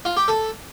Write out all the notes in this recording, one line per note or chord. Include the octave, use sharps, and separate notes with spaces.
F4
G4
A4